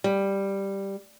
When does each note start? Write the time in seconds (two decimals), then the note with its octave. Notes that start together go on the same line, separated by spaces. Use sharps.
0.04 G3